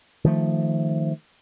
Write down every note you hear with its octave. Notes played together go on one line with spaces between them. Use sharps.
D#3 F3 A3